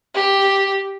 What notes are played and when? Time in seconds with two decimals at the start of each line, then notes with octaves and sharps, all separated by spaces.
0.14 G4